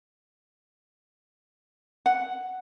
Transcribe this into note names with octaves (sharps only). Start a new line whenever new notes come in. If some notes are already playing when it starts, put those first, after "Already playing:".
F#5